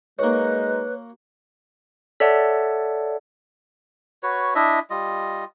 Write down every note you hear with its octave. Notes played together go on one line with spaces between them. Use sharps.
G#3 A#3 D#4 F#4 B4 C#5
A4 C#5 D5 E5 F#5 A5
F#4 B4 C#5
D4 E4 D#5 E5
G3 F4 D#5